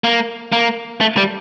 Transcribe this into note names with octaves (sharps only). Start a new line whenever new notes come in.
A#3
A#3
A3
G3